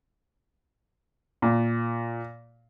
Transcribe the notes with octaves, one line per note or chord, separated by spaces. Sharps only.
A#2